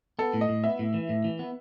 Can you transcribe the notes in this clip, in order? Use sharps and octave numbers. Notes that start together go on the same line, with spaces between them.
B3 A4
A2
D#5
A2
B3 E5
A2
E3
A2
E3
B3